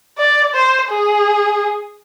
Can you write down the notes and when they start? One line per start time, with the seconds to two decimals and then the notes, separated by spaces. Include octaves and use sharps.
0.18 D5
0.54 C5
0.89 G#4